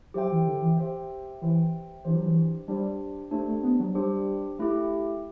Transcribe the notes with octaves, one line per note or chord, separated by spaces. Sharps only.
F#3 G4 C5 E5 G5
E3
D3
E3
G4 C5 E5 G5
E3 G4 C5 E5 G5
E3 D4 G4 C5
F#3
E3
G3 D4 G4 C5
A3 D4 G4 C5
A3
B3
F#3
G3 D4 G4 C5
A3 E4 G4